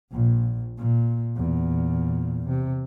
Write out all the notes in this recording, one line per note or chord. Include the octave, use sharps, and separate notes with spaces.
A#1 A#2
A#2
E2 A#2
C3